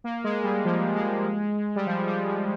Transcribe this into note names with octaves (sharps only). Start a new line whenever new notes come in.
A#3
G#3
G3
F3
G#3
G3
F3
G3
F3